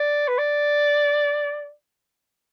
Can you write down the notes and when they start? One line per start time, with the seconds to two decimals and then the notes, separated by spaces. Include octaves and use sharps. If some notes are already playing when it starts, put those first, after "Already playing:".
Already playing: D5
0.28 B4
0.38 D5